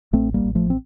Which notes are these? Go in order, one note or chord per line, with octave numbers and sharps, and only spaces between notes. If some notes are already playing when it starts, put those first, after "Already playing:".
A1 A3 C4
G3 A#3
A1
F3 A3
C4